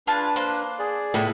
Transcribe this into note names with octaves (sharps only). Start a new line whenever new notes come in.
D4 F4 G#4 B4 A5
A#3 C5
G#4 D5
A2 E4 B4